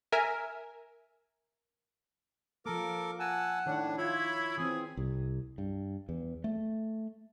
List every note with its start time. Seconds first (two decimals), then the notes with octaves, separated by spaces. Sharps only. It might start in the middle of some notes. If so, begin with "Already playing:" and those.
0.12 A#4 E5 G#5
2.66 F3 A#3 A4 A#4 D6
3.20 F#5 G#5 A5 E6
3.66 A2 D#3 D4 C#5
3.98 E4 F4 C#5 B5
4.58 E3 C4 G#4
4.97 C2
5.58 G2
6.09 E2
6.44 A3